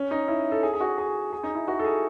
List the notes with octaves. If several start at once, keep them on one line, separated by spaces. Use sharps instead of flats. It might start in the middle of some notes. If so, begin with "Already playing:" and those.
Already playing: C#4
D#4
E4
A4
G#4
G#4
F#4
G#4
G#4
D#4
E4
F#4
A4
G#4